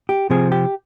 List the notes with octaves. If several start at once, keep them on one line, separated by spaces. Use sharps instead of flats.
G4
C3 F3 C4 G#4
G4